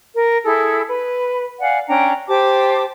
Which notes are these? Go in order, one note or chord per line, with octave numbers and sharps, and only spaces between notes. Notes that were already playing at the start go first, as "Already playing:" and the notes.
A#4
E4 G#4 A4
B4
D5 F5 F#5 G#5
C#4 D4 G5 A#5
G4 C5 A5 D6